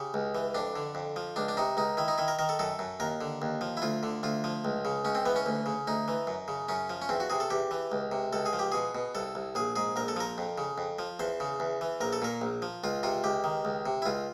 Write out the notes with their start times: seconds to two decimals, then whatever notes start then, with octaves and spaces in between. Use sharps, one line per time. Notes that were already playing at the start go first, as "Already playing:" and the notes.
Already playing: C#3 G4
0.14 C#2
0.35 E3
0.55 F2 D4
0.76 D3
0.95 F2
1.16 F3
1.36 C#2 D4
1.48 D4
1.57 C3 D#4
1.77 C#2 D#4
1.97 D#3 E4
2.08 D#4
2.18 D#3 E4
2.28 A#4
2.39 D#3 A#4
2.49 A4
2.59 F#2 A4
2.79 F#2
3.00 D#2 A#4
3.21 D3
3.42 D#2
3.61 F3
3.77 E4
3.82 D2 F4
4.03 D3
4.23 D2 F4
4.44 F3
4.65 C#2
4.85 C#3
5.05 C#2 C#4
5.15 C4
5.25 E3 B3
5.36 C#4
5.46 D2
5.66 C#3
5.87 D2 D#4
6.08 E3
6.27 F#2
6.48 C#3
6.69 F#2 C#4
6.90 F3
7.02 C#4
7.09 E2 C4
7.20 F#4
7.30 C3 G#4
7.40 A4
7.50 E2 G4
7.71 E3
7.92 C#2
8.12 C3
8.33 C#2 A4
8.46 G#4
8.53 F3
8.59 G4
8.72 B2 G#4
8.95 B2
9.15 C2 A4
9.35 C2
9.55 A#1 G#4
9.76 G#2 G#4
9.96 A#1 A#4
10.08 A4
10.16 F3 A#4
10.38 F2
10.58 C#3
10.78 F2
10.99 F3
11.19 E2 C5
11.40 C#3
11.60 E2
11.81 E3
12.01 A#1 A#4
12.13 A4
12.22 A#2 A#4
12.42 A#1
12.62 F3
12.84 C#2 F4
13.03 C3 F4
13.24 C#2 G4
13.44 D#3
13.65 C#2
13.86 C3
14.02 E4
14.06 C#2 F4